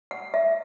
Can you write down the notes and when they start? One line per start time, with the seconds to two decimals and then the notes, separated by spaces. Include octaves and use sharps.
0.11 F#5
0.34 E5